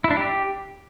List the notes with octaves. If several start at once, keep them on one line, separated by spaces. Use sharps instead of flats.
E4
D4
G4